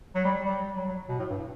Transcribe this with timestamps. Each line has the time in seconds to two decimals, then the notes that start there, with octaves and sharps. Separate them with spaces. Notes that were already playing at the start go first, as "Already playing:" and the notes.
0.15 F#3
0.25 G3
0.45 G3
0.76 F#3
0.88 F#3
1.09 B2
1.19 A2
1.30 G2